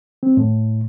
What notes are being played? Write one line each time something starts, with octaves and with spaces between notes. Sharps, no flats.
C4
A2